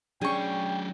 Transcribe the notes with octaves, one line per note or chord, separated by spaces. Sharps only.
F#3 C#4 D4 G#4 D5 G5 C#6